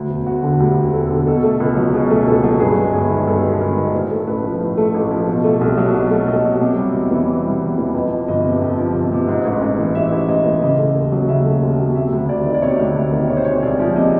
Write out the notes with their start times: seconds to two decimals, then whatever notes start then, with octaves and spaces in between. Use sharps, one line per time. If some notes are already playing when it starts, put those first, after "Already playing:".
Already playing: D2
0.10 E1
0.26 E1 F#4
0.43 D3
0.60 D2 G4
0.76 E1
0.93 E1 A4
1.10 D3
1.27 B2 A4
1.44 A3
1.60 C#2
1.77 F#3
1.94 B2 G#4
2.11 A3
2.27 C#2 A4
2.44 F#3
2.60 G2 G#4
2.77 G#3
2.94 G1 G#4
3.11 D#3
3.27 G2 A4
3.44 G#3
3.61 G1 A#4
3.77 D#3
3.94 A2 C5
4.11 A3
4.27 A1 B4
4.44 F3
4.61 A2
4.77 A3
4.94 A1
5.11 F3
5.27 B2
5.44 A3
5.61 C2
5.78 F#3
5.94 B2
6.11 A3
6.28 C2 D#5
6.45 F#3
6.61 C3
6.78 G3
6.94 E2
7.11 E3
7.28 C3
7.45 G3
7.61 E2
7.78 E3
7.95 F2 D#5
8.12 F3
8.28 G1 D#5
8.45 C3
8.62 F2
8.78 F3
8.95 G1
9.12 C3
9.28 G#2
9.45 A1
9.61 A1
9.79 E3
9.95 G#2 E5
10.12 A1
10.28 A1 D#5
10.46 E3
10.62 C#3 D#5
10.79 A3
10.95 D#2
11.12 F#3
11.29 C#3 E5
11.46 A3
11.62 D#2
11.79 F#3
11.96 C3 E5
12.12 D2
12.29 D2 D5
12.46 D#3
12.54 D5
12.62 C3 C#5
12.79 D2
12.96 D2
13.12 D#3
13.29 C3 C#5
13.37 C5
13.45 G#3 C#5
13.63 C2 D5
13.79 F3
13.96 C3 D#5